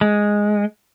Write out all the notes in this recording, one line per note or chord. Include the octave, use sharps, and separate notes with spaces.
G#3